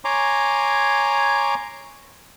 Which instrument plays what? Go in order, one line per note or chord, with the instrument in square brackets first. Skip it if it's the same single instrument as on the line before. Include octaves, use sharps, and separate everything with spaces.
[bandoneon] C#5 G#5 A#5 C6 D6